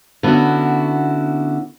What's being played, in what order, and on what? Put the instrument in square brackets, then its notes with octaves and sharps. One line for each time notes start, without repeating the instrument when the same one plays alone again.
[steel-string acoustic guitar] D3 B3 C#4 E4 F#4